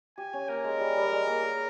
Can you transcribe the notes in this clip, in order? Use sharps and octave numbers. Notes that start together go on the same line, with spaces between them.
G4 G#5
C#4
A#3 A#4
G#3
G3
G3
G#3
A#3
G#4